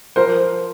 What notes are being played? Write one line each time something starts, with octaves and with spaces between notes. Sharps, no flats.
F3 A#4 C5